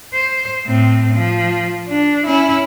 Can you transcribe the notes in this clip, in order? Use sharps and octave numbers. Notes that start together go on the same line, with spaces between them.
C5
A2 C4
F3
D4
C#4 E4